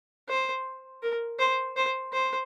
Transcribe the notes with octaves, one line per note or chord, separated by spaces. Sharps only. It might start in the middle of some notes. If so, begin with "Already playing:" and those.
C5
A#4
C5
C5
C5